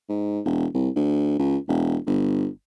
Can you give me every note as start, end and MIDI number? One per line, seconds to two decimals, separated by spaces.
0.09 0.40 44
0.45 0.66 28
0.74 0.89 36
0.96 1.37 38
1.39 1.57 37
1.68 1.97 28
2.07 2.47 31